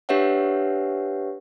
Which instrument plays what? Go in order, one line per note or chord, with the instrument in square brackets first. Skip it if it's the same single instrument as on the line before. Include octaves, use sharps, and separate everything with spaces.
[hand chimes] D4 G4 B4 C#5 E5 F#5